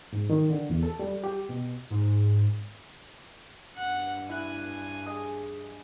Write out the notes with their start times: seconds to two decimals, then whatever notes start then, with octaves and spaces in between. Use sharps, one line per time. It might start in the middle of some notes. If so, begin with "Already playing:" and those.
0.13 G#2
0.30 D#3
0.50 D3
0.70 E2
0.83 A4
0.99 G3
1.24 G4
1.49 B2
1.90 G#2
3.76 G2 F#5
4.29 E4 G#5 F#6
5.06 G#4 D#5